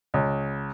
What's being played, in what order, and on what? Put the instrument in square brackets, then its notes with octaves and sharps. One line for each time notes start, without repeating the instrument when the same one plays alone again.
[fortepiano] C#2